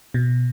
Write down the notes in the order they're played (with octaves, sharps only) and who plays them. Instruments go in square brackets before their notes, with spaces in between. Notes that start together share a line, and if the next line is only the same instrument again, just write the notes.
[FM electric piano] B2